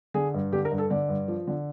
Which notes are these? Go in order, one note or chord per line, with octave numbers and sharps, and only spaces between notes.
D3 G#4
G2
D3 G4
A#4
G2
A4
D3 D5
G2
F3
D3